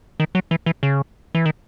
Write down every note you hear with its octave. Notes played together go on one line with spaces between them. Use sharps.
D#3
F#3
E3
E3
C#3
E3
D#3